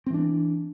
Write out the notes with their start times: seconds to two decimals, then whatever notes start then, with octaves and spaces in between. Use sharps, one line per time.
0.06 C4
0.10 E3
0.14 D4